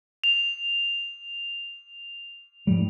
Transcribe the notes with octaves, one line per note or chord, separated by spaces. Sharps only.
F7
G#2 F3 G3